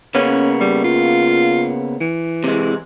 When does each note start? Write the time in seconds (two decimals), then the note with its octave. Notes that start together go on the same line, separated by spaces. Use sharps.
0.15 C#3 A#3 B3 C#4
0.61 G3
0.84 F4
2.01 E3
2.44 C3 G#3